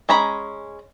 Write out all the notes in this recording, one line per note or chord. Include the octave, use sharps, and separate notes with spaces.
G#3 C#4 A#5 B5